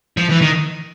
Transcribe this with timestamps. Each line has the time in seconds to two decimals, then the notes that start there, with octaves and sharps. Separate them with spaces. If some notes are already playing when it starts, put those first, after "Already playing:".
0.17 F3
0.30 E3
0.41 D#3